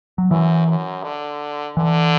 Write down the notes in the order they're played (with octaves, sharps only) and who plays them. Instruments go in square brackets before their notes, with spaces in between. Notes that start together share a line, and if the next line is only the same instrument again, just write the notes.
[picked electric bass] F#3
[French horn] F#2 [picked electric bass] E3
[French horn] F#2
D3
[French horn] D3 [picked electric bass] E3